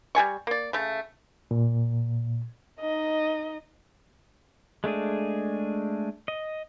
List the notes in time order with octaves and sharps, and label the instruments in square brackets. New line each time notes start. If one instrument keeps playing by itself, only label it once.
[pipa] G3 G#4 G#5 C#6
A#3 D5
C#3 A3
[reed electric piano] A#2
[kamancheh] D#4 D#5
[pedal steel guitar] G#3 A3 D4 G#4
D#5